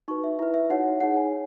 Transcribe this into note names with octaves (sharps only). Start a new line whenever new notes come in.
D#4 F#4 B4 C#6
E5
E4 B4 E5
E5
D#4 F#4 C#5 F#5
D#4 G#4 C#5 F#5
G#5